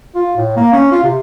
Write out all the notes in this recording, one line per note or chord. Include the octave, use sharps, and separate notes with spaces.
F4
A2
A#3
C#4
F4
C3